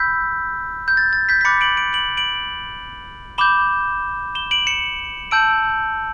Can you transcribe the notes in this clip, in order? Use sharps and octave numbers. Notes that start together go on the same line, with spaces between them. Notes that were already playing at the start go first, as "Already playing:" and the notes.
Already playing: B5 E6 G6 B6
G6
A6
A6
G6 B6
B6
B5 D6 F#6 A6 C#7
D7 F#7
D7 F#7
D7 F#7
D7 F#7
B5 D6 G6 E7 G7
E7 G7
D7 F#7
C#7 E7
A5 E6 G6 D7 F#7